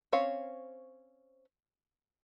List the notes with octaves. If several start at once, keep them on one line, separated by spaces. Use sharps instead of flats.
C4 C#4 C#5 F5